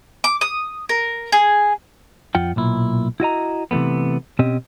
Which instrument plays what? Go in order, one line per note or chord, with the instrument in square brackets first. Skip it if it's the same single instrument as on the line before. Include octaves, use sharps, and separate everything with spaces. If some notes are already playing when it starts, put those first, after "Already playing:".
[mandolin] D6
D#6
A#4
G#4
[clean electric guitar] F2 F4 F#5 G5
B1 A#2 E4
E4 F#4 D#5 A#5
C3 E3 F3 A3 B3
B2 C4 C#4 G4 D#5